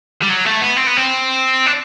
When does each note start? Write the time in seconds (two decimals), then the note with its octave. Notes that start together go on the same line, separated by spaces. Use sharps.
0.22 G3
0.30 F#3
0.46 A3
0.62 B3
0.77 C4
0.87 B3
0.97 C4
1.66 D4